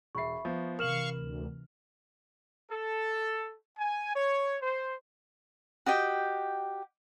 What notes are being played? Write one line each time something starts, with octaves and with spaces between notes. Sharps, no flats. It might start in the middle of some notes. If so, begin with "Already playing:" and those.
E1 E5 B5 C#6 C7
F3 B3
C3 E3 A#4 F5 C#6 F6 E7 F#7
D2
A4
G#5
C#5
C5
F#4 G4 D#5 G5